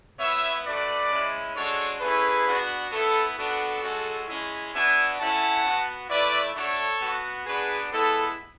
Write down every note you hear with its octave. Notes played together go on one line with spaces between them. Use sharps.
B3 E4 C#5 E5
A3 D4 F#4 B4 D5
G#3 C#4 E4
G#3 D4 F#4 A4 C#5
A3 C#4 E4 G#4 B4
B3 D4 F#4
B3 E4 A4
B3 D4 F#4 A4
G#3 C#4 F#4
G#3 C#4 E4
B3 D4 F#4 E5 G#5
A3 C#4 E4 F#5 A5
B3 F#4
A3 E4 B4 D5
A3 D4 F#4 A4 C#5
B3 F#4
B3 D4 F#4 G#4 B4
G#3 B3 E4 A4